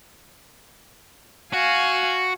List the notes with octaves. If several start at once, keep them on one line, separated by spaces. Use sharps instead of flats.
F#4 F5 G#5